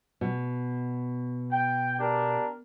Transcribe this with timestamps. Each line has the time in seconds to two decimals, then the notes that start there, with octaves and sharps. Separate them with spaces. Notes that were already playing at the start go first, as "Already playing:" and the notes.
0.21 B2
1.51 G5
1.99 D4 G4 A#4